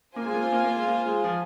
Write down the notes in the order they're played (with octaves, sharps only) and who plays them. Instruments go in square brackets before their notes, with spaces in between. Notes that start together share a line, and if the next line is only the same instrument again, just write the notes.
[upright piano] A#3 [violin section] F4 C5 G#5
[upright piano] G#3
A#3
C4
A#3
A#3
G#3
A#3
G#3
F3